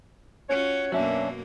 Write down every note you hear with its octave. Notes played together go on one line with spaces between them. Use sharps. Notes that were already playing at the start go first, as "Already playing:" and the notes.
C#4 F4 F#4 C#5
F#2 B2 F#3 A#3 C#4 D4 E5